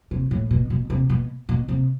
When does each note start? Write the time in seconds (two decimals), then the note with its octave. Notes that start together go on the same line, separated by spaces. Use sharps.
0.11 C3
0.31 A2
0.51 B2
0.70 B2
0.90 C3
1.10 B2
1.49 B2
1.68 C3